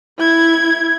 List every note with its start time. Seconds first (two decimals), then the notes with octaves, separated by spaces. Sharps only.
0.18 E4 G#6